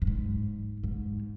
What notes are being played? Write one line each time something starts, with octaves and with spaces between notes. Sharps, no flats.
G2
G#2
G#2